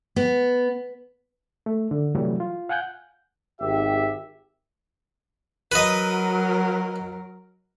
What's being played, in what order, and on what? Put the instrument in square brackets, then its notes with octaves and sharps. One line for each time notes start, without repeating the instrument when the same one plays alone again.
[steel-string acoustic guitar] B3
[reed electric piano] A3
D3
C3 E3 F#3 G3 A3
F4
F5 F#5 G#5 F#6 G6
[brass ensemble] G#1 G4 E5
[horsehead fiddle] F#3 A#4 [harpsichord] B4 D#5